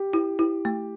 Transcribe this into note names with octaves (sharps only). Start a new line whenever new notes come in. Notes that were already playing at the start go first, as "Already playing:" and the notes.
Already playing: G4
E4
E4
A3